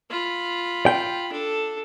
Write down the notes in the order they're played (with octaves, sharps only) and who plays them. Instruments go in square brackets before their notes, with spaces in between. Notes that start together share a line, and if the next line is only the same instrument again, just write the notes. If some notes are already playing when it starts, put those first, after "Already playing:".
[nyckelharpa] F4 B5
[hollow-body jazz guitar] G5
[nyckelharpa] D4 A4